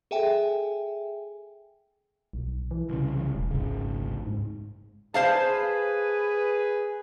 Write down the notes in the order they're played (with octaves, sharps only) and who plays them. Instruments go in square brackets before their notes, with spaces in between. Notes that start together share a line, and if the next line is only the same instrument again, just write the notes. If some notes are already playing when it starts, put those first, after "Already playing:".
[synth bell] G#4 A4 E5 G5 G#5
[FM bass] B1
E3
[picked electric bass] C2 C#3
[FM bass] E1
[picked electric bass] G#1 C#2 [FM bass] C#3
[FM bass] G#2
[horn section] G#4 B4 [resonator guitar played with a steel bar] C5 F5 A5